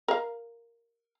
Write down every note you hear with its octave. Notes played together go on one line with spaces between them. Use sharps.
A#4 F5